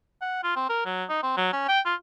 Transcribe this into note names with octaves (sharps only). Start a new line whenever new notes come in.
F#5
F4
C4
A#4
F#3
D#4
C4
F#3
C#4
G5
F4